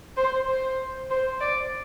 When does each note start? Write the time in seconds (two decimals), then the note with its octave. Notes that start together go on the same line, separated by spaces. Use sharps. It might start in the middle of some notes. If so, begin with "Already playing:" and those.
0.17 C5
0.48 C5
1.10 C5
1.41 D5